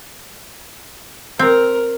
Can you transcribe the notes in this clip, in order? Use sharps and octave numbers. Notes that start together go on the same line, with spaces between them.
C4 A#4